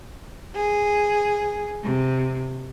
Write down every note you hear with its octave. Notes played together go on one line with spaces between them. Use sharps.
G#4
C3